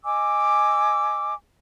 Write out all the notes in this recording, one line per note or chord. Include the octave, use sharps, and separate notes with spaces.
D#5 G#5 D6 E6